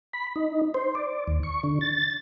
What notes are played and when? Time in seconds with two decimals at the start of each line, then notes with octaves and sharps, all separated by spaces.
0.13 B5
0.36 D#4
0.74 C5
0.95 D5
1.27 D#2
1.43 C#6
1.63 D3
1.81 A6